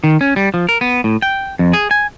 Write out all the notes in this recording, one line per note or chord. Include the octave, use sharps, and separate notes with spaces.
D#3
C#4
G3
F3
A#4
B3
A2
G5
F2
G#4
G#5